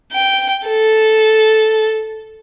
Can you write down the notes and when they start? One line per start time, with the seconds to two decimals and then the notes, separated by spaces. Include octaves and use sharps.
0.13 G5
0.68 A4